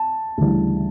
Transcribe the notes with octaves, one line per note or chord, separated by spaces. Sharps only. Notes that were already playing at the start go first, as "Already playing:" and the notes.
Already playing: A5
D2 C#3 E3 G3